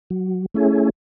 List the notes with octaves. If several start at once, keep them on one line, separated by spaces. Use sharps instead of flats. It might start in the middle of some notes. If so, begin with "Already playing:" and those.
F#3
A3 C#4 E4 G#4